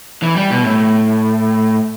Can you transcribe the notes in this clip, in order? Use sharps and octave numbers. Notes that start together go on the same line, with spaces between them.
E3
G3
B2
A2